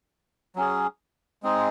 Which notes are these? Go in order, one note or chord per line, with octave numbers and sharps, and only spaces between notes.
F#3 C#4 G#4
G#3 C4 D#4 G#4